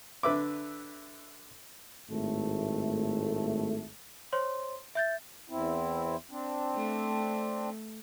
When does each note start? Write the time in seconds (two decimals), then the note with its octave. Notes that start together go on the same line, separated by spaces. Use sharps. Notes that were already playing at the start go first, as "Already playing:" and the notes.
0.23 D3 B4 E5 D6
2.10 G#1 A2 A3
4.33 C5 C#5 C6
4.95 E5 G6 A6
5.49 E2 C4 E4
6.30 C4 D4
6.75 A3